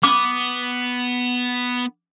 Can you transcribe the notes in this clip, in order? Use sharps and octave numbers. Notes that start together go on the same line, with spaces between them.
B3 D6